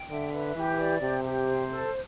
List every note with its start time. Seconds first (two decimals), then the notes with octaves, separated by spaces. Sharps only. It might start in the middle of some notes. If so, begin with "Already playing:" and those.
Already playing: G5
0.10 D3 E5
0.33 B4
0.56 E3 G4
0.79 D5
1.01 C3 G4
1.24 G4
1.48 C5
1.70 A4